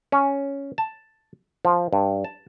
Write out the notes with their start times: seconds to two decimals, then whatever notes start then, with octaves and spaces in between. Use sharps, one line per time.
0.12 C#4
0.78 A5
1.65 F3
1.93 G2
2.24 A5